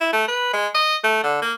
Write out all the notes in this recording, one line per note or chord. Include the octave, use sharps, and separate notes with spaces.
E4
A3
B4
G#3
D#5
A3
D3
A#3